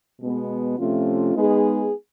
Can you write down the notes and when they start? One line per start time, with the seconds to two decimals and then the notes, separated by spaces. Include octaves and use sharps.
0.21 B2 G#3 B3
0.78 C3 F3 A3 C#4 F4
1.34 G#3 B3 D#4 G#4